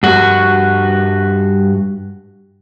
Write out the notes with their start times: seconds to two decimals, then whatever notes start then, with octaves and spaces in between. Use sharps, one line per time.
0.03 G2 F#4